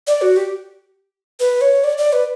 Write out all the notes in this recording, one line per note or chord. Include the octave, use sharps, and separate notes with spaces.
D5
F#4
G4
B4
C#5
D5
D5
B4